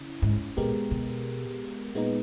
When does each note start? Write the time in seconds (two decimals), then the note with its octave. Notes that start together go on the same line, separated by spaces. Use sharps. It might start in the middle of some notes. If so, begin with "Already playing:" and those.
Already playing: C#3 C#4 E4
0.22 G#2
0.57 A#2 G#3 B3 G4 A#4
0.91 B2
1.95 A#2 G#3 B3 D#4